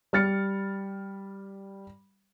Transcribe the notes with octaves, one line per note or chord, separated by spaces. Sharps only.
G3 F6 A6 C#7